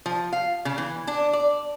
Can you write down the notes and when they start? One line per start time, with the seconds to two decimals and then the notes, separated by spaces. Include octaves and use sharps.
0.06 F3
0.33 F5
0.65 C#3
0.78 E3
1.07 D4
1.33 D5